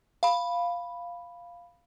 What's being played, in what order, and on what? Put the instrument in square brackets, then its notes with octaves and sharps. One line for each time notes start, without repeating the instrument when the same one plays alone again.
[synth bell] F5 B5